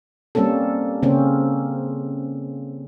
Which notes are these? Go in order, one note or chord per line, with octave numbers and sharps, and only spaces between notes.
G3 A#3 C4 C#4 A4
C#3 A#3 C4 C#4